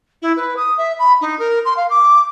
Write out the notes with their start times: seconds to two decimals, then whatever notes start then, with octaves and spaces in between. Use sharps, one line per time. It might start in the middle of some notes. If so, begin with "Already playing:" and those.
0.22 E4
0.36 B4
0.56 D#6
0.77 E5
0.99 B5
1.21 D#4
1.39 A#4
1.65 C6
1.76 F5
1.90 D6